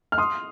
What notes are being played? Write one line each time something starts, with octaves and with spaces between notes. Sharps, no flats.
F6
C6 D#6